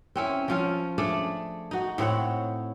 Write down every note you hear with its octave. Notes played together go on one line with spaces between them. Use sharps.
C4 C#4 E4
F3 C#4 F4
A3 D4 G#4 D5
D#4 F#4
A2 C4 C#5 F#5